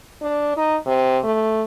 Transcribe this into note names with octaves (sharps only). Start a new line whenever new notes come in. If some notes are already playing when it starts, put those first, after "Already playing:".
D4
D#4
C3
A3